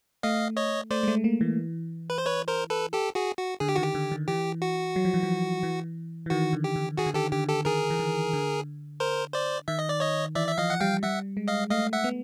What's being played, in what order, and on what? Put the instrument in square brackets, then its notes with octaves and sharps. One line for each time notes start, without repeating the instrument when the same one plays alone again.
[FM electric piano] A3 [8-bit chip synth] D#5 F5
[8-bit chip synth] C#5 D#5
[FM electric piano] A3 [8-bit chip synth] C5 D5
[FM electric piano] G#3
A3
A#3
E3
[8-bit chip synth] B4
C5
B4 C#5
A#4 C5
A4 B4
G4 A4
F#4 G#4
F#4
[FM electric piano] D3 [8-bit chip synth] G#4
[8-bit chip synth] G4
[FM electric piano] D#3 [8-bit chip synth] F#4
[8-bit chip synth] G4
[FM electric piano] D3
D#3
[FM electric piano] E3 [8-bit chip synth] G4
[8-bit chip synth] F#4
[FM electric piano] F#3
F3
E3
F3
E3
E3
[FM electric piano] D#3 [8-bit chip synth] F#4
[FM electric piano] D3
[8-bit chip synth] G4
[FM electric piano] D3
[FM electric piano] D#3 [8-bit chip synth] F#4 G#4
[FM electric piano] D3
[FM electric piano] D#3 [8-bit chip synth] G4 A4
[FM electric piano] D3 [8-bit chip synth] G4
[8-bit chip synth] G4 A4
[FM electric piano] D#3 [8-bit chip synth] G#4 A#4
[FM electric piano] E3
D#3
D3
[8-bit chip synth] A#4 C5
C5 D5
[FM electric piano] D#3 [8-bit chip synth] E5
[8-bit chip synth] D#5
D5
C#5 D#5
[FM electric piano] E3 [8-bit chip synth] D5 E5
[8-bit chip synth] E5
[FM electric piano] F3 [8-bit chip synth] D#5 F5
[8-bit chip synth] F#5
[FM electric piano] G3 [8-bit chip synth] F5 G5
[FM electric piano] G3 [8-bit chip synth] E5 F#5
[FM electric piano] G#3
[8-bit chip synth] D#5 F5
[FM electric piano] A3 [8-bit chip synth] D#5 F5
[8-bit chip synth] E5 F#5
[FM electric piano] B3